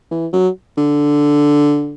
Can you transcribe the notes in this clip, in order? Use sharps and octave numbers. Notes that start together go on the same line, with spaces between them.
E3
F#3
D3